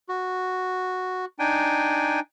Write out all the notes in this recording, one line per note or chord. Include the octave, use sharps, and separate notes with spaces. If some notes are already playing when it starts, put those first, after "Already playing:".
F#4
D4 D#4 G5 G#5